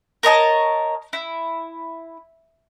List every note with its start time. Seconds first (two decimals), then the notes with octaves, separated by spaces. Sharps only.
0.23 A#4 C#5 D#5 A5
1.13 E4